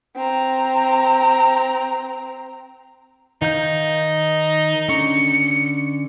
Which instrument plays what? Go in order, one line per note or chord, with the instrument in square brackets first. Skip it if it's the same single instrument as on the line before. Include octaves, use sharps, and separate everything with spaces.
[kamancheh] C4 A#5
[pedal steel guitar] D#3 F5 G6 [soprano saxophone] D#4
[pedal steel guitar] D3 C#4 C#6 [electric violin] C#7